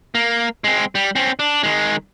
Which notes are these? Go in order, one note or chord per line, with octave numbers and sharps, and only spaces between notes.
A#3
G#3 C4
G3
C4 C#4
D4
D#3 G#3